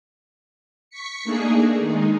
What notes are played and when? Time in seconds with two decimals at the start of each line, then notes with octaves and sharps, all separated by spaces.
0.90 C#6 B6 C#7
1.24 A3 A#3 D4 D#4 G#4
1.79 D#3 G#3 D#4